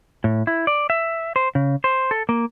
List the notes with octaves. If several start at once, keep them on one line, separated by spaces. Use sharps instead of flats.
A2
E4
D5
E5
C5
C#3
C5
A4
A#3